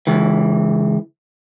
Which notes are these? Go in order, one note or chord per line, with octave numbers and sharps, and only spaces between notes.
C#2 E3